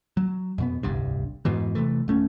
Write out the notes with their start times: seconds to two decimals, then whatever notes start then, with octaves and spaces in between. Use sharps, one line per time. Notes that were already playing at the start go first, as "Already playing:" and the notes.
0.17 F#3
0.58 F2 B2 B3
0.83 D1 G1 C2 G2
1.45 F2 G#2 B2 E3
1.75 C3 E3 A3
2.08 D1 A3 C#4